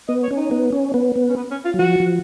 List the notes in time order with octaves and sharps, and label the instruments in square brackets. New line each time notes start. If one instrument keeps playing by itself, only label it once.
[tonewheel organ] B3 [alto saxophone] D#5
[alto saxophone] C#5
[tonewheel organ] C#4
[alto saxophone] D#4
[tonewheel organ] B3
C#4
B3
B3
[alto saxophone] C#4
B3
C#4
F4
[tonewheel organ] F#3
[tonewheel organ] F3 [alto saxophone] F#4
[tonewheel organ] F3